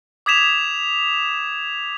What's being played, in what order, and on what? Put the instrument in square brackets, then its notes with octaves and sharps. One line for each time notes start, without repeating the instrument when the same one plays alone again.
[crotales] D6 D#6 G#6 B6 E7 F7